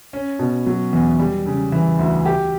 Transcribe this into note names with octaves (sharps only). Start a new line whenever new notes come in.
C#4
B2
F#3
E2
G3
C#3
E3
D2
G4